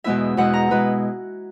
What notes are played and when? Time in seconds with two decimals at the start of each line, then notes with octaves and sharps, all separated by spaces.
0.04 E2 B2 G#3 B3 E4 E5
0.37 E2 B2 G#3 B3 E4 F#5
0.53 A#5
0.70 B2 G#3 B3 E4 B4